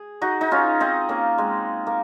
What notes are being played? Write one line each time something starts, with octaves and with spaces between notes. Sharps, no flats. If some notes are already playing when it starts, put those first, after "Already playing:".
Already playing: G#4
D#4 F#4
D#4
C#4 F4
C4 D#4
A#3 C#4
G#3 C4
A#3